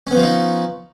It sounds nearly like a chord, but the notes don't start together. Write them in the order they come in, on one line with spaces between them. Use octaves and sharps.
C#4 B3 F3 F4 D#4